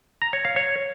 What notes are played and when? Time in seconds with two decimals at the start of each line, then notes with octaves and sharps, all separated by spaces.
0.22 A#5
0.33 C#5
0.45 F5
0.56 C#5